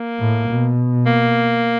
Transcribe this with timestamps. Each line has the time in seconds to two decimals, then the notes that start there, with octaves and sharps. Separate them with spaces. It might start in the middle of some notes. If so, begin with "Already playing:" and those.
Already playing: A#3
0.20 A2
0.49 B2
1.06 A#3